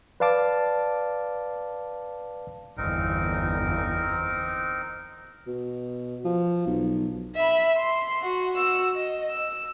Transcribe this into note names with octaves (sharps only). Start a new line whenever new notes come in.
B4 D5 F5 A5 D6
G1 E2 C4 D#4 A#4
B2
F3
B1
E5 B5
C6
F#4
F#4 E6
D#5
E6